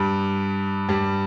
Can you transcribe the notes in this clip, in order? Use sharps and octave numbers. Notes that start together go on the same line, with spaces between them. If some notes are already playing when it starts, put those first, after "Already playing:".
Already playing: G2 G3
G2 G3